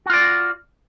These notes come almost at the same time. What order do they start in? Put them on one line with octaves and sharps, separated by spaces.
F#4 F4 D5